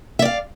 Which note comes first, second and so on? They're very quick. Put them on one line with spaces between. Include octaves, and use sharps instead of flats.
E5 D5 F5